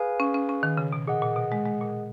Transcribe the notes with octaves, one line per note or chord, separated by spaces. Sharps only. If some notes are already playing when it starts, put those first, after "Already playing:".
Already playing: G#4 B4 F5 G#5
C#4
C#4
C#4
D#3
C#3
B2
A#2 G#4 D#5 F#5
A#2
B2
G#3
G#3
A#2